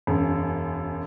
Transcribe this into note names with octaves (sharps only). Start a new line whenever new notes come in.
E1 F#2